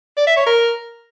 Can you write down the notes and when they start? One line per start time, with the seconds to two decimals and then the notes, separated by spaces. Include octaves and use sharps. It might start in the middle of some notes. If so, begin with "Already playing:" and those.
0.17 D5
0.27 E5
0.37 C#5
0.46 A#4